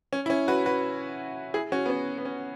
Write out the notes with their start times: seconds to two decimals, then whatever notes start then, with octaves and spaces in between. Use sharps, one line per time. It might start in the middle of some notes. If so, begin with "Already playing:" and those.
0.13 C#4
0.26 E4
0.30 C#4
0.48 F#4 B4
0.66 F#4 B4
1.54 E4 G#4
1.72 C#4 F#4
1.86 B3
1.90 C#4
2.18 B3
2.25 C#4